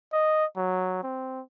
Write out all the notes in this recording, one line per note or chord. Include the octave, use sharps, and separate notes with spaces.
D#5
F#3
C4